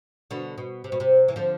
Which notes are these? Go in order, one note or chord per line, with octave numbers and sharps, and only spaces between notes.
B2 D3
B2
C3
B2
C3
E3
D3 F3